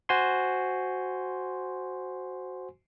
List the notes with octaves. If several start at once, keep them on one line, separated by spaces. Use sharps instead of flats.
F#4 C5 G#5 C6